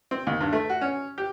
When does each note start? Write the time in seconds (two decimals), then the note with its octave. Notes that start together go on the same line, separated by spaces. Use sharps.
0.11 C4
0.27 D#2
0.41 G2
0.53 A3
0.70 F#4
0.81 C#4
1.18 G4